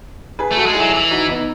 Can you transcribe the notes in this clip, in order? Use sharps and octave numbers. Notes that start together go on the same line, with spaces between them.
G#4 B4
A3
F#4 A4
G#3
F#3 E4 G#4
E3
D#4 F#4
B3 D#4